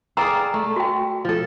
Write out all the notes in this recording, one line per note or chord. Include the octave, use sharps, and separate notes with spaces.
G#4 D5 F5 G5 A#5 E6
A3
F#4 G5
F3 A4